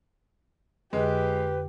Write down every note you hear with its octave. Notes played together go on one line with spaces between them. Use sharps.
F2 D3 G#3 G4 B4